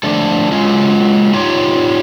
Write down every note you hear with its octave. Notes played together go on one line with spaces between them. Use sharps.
F3 A3 D4 A4
F#3 G#3 C#4 F4
D#4 F4 G4 C#5